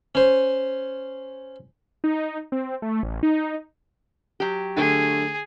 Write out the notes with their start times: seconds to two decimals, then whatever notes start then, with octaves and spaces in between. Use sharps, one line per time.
0.15 C#4 C5
2.04 D#4
2.52 C4
2.82 A3
3.03 A1
3.23 D#4
4.40 F#3 G4
4.76 D3 A3 G#4